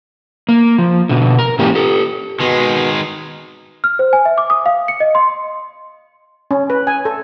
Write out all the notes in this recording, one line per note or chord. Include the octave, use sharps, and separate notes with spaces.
A#3
F3
B2 D3
A#4
G#2 E3 A#3 C#4 G4
G4 A4
B2 D#3 G#3
F6
C5
G#5
E5
D6
D#6
F5
C#7
D#5
C6
C#4
B4
G#5
A4